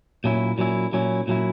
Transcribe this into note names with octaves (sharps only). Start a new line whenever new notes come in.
A#2 F#3 C#4 E4
A#2 F#3 C#4 E4
A#2 F#3 C#4 E4
A#2 F#3 C#4 E4